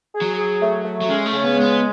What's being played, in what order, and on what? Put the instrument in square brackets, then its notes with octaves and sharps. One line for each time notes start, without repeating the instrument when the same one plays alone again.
[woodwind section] G#4
[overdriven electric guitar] F#3
[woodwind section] G#4
A3
A3
[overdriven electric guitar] F#3
[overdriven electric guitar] G#3 [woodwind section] C#4
[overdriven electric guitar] A3
[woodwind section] C#3
[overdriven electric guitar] B3
[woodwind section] G#3
[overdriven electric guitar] B3